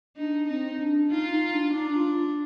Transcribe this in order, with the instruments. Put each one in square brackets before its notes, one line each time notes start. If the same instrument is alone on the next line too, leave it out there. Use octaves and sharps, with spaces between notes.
[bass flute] D4 [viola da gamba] D#4
[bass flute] C4 [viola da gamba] D#4
[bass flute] D4
[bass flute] D#4 [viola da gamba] F4
[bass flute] D#4
D4
[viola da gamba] D4 [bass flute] D#4
[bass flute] F4